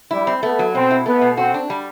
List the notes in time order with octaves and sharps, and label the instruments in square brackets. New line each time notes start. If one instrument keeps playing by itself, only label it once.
[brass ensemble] G3 [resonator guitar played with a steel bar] E4
[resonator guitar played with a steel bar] C4
[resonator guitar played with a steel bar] A3 [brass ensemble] B3
[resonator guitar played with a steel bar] F#3
[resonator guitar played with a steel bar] B2 [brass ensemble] C4
[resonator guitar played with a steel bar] E4
[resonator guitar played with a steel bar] A3 [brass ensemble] B3
[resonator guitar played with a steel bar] B2
[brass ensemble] C4 [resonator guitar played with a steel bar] F#4
[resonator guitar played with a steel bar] D4
G3